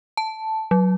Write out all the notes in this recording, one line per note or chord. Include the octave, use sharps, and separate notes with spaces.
A5
F#3